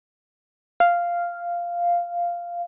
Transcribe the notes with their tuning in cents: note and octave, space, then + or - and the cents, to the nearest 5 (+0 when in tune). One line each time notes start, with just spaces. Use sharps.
F5 -5